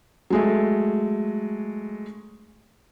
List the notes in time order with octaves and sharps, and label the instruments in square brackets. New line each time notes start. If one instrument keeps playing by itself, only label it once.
[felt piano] F#3 G#3 A3